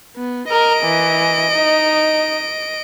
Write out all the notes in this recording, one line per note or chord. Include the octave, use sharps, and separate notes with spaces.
B3
A#4 D#5 D7
E3
D#4